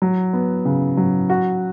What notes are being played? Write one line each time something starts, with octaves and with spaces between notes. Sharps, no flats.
F#3
B3
C#3
F#3
F#4